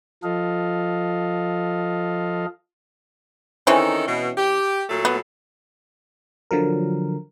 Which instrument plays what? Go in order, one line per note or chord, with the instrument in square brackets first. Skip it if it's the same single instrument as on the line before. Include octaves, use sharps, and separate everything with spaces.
[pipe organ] F3 F4 A4 D#5 F5
[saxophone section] D#3 D#4 A4 [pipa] E3 C4 C#4
[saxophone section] B2
G4
A#2 F#3 A3
[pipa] B3
[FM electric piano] D3 F3 F#3 A#4